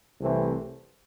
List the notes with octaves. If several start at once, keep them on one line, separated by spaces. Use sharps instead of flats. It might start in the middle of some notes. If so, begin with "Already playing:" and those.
C2 C3 E3 A3 C4